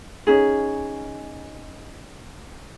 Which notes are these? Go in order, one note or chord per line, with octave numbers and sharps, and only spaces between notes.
C#4 D#4 G#4